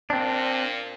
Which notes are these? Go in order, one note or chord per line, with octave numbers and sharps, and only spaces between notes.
A#2 C4 D4